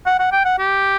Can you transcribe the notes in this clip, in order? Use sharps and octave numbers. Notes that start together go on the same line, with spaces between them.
F#5
F#5
G5
F#5
G4